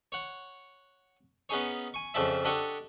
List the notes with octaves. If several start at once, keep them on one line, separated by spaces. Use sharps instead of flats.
C#5 F#5
B3 C#4 D#4 G#4 C#5
G#5 C#6
F2 C#3 F3 D5 E5
D4 G4 A4 D#5 F#5 C#6